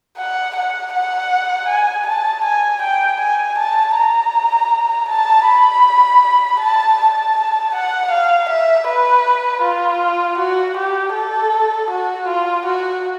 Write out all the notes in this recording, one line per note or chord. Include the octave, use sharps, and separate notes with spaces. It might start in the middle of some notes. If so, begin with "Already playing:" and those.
F#5
F#5
F#5
G#5
A5
G#5
G5
G#5
A5
A#5
A5
B5
A5
A5
F#5
F5
E5
B4
F4
F#4
G4
A4
F#4
F4
F#4